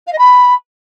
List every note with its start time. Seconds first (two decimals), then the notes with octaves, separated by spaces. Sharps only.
0.06 F5
0.12 D#5
0.18 B5